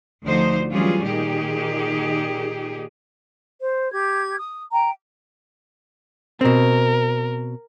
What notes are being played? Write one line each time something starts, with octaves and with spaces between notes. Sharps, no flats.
D2 D3 F3 D#4 C5
E3 F#3 G3 C#4 F4 G#4
A#2 D#3 D#4 G4 G#4
C5
G4 G#6
D#6
G5 A#5
B2 C4 A#4